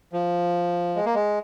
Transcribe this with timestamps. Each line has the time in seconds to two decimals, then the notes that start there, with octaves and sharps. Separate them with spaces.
0.13 F3
0.96 G#3
1.06 A#3
1.15 G#3